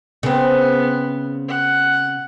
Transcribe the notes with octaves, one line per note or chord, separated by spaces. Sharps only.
C#3 B3 C4
F#5